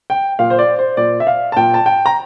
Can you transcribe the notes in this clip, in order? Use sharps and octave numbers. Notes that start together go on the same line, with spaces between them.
G5
A#2 F5
C5
D5
C5
A#2 D5
E5
F5
A5
A#2 G5
A5
G5
A#5